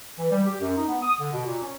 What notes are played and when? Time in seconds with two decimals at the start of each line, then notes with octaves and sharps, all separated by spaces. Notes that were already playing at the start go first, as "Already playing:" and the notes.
0.17 E3
0.30 G3
0.46 G4
0.60 F#2
0.76 D#4
0.88 B3
1.02 D#6
1.19 D3
1.32 B2
1.45 A#2
1.62 C#4